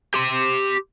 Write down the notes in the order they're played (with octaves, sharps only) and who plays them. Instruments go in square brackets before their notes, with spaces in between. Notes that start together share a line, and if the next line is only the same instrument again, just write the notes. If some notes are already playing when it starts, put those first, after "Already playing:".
[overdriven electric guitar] G4 C6